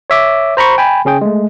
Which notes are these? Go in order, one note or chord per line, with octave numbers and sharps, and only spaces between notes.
C#5 E5 D6
C5 A#5 B5 C#6
G5 G#5 B5
C#3 C#4 G#4 G5
G#3 A3